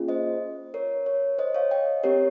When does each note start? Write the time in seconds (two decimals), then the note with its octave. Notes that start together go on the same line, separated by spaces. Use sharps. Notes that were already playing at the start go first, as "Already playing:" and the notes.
Already playing: A#3 C#4 F4 G#4
0.08 C5 D#5
0.74 A#4 C#5
1.06 A#4 C#5
1.39 C5 D#5
1.55 C#5 F5
1.71 D#5 G5
2.04 C4 G4 A#4 C#5